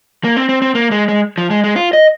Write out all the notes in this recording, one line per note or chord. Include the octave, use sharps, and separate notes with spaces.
A#3
C4
C4
C4
A#3
G#3
G#3
F3
G#3
G#3
F4
D#5